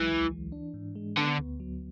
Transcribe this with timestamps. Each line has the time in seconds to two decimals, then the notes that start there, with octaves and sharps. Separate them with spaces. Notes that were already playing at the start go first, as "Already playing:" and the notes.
Already playing: B1 E3 F#3 G#3
0.09 D2
0.31 E3
0.52 D4
0.74 G#2
0.95 G#3
1.17 D3 B3
1.39 D2
1.60 F#3